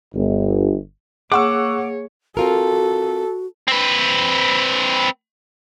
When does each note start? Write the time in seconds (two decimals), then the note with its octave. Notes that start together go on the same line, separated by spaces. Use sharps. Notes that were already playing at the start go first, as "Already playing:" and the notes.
0.14 G1
1.32 A#3 G#4 C#5 F#5 C#6 D6 E6
2.37 C4 F4 F#4 A4 A#4
3.68 C4 B4